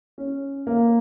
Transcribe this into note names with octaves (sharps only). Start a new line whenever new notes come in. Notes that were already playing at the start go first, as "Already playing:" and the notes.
C#4
A#3